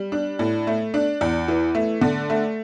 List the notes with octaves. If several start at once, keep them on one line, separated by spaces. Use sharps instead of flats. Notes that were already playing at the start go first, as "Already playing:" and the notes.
Already playing: G3
D4
A2
A3
D4
E2
E3
A3
D3
A3